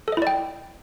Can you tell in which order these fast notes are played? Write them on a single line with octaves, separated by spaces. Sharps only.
A4 D#5 E4 D5 G5